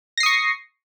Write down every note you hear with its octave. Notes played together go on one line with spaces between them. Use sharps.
C#6 D#6 A#6 C7